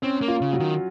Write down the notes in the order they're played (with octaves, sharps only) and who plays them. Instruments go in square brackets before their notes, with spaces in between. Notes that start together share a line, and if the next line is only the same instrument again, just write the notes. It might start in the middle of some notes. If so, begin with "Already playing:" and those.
[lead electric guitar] C4 [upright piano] C#4
[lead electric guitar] A#3
[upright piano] F4
[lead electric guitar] C#3
[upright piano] F#3
[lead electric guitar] D#3